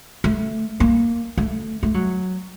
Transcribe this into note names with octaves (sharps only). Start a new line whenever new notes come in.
A3
A#3
A3
A3
F#3